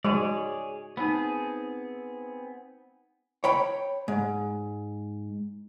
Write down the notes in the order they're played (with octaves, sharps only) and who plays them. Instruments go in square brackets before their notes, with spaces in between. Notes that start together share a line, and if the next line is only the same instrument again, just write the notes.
[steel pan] G#3 [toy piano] F#4 [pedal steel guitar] G#4 C#5 D5
[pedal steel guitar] B3 C4 G#4 [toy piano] D#4 C5 B5
[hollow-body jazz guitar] C#5 G5 B5
G#2